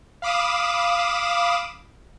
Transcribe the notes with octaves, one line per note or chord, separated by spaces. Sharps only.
F5 B5 D6 D#6 E7